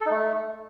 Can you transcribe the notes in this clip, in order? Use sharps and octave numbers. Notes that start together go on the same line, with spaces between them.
A4
D#4
A3